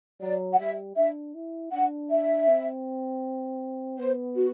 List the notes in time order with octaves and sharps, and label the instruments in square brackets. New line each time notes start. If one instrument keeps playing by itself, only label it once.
[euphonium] F#3 [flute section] D5
[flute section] F#5
[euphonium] G3 [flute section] E5
[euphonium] D4 [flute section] E5
[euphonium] E4
[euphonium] D4 [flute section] F#5
[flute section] E5
[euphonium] C4
[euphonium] B3 [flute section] C5
[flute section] F#4